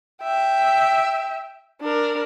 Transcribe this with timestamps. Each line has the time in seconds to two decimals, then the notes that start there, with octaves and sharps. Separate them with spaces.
0.23 E5 G5
1.81 D4 A#4